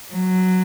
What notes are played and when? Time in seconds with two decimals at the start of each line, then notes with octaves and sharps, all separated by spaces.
0.14 F#3